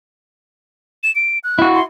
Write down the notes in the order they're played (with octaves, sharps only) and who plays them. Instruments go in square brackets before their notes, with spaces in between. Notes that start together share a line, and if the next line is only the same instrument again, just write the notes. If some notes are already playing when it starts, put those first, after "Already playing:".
[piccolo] E7
D7
F#6
[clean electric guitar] E4 F#4
[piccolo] C6